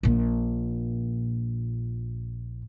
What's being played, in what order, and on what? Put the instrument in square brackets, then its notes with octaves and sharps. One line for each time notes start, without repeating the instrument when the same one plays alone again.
[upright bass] A#1 A#2